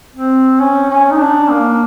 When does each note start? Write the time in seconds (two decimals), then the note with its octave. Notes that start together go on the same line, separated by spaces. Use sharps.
0.15 C4
0.60 C#4
0.90 C#4
1.11 D#4
1.20 D4
1.50 A#3